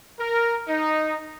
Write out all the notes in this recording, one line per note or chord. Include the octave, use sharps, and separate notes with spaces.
A#4
D#4